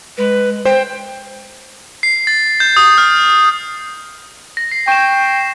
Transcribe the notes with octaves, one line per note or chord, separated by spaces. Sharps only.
G#3 B4
C5 G5
C7
A6
G6
D#6
F6
A#6
C7
G5 C#6 E7